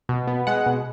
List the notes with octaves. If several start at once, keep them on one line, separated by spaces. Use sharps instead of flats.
B2
B3
G#3 F#5
B2